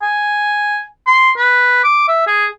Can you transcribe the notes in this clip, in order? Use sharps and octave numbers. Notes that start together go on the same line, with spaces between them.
G#5
C6
B4
D6
E5
G#4